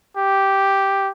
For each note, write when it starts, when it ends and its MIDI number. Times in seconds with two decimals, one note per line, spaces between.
0.17 1.10 67